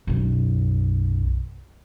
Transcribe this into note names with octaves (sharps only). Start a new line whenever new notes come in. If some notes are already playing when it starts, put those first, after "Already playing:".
B1 F#2